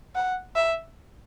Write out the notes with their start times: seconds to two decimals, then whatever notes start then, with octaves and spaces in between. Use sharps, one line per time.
0.15 F#5
0.56 E5